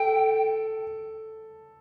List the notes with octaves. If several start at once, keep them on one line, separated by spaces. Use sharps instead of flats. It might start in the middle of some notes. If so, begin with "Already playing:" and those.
Already playing: A4 G5